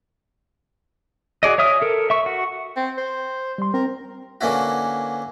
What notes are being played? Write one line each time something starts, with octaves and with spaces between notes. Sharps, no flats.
F#4 G#4 D5 D#5
C#5 E5 D#6 F6
A4 A#4
E5 C#6
F#4
C4
C5
G3 C6
C4 A#4
D3 E3 A#3 C#4 E4 F#4